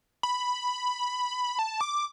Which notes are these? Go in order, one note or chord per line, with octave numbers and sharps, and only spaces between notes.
B5
A5
D6